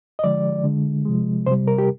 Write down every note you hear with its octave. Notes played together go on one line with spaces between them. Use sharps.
D#5
D3 F3 G#3 D5
D3 G#3
C3 F3 G#3
C3 G3 C5
A#4
G4